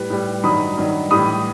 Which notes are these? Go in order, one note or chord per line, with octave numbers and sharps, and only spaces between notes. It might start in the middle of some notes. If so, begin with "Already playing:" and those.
Already playing: A2 G3 B4
A2 G3
G2 D#3 F#3 B5 D#6
G2 D#3 F#3
A2 E3 G3 B5 D#6